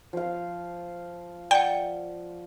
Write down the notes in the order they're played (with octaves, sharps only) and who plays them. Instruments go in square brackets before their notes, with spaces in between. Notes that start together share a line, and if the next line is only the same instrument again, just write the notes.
[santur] F3 F5
[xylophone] D5 F#5 [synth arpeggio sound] G5